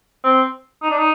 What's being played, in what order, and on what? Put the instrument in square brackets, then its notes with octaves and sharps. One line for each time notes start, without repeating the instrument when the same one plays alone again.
[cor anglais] C4
D#4
D4
D#4